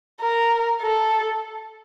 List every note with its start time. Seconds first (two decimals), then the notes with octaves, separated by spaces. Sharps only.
0.21 A#4
0.82 A4